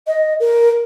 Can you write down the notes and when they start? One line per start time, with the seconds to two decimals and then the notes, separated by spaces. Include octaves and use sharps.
0.06 D#5
0.40 A#4